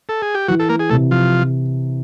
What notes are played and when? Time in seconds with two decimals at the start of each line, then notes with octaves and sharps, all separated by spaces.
0.09 A4
0.22 G#4
0.35 G4
0.48 E3 F#3 F#4
0.60 A4
0.69 A#3 A#4
0.79 G#4
0.90 C3 A3 A4
1.11 F3 F4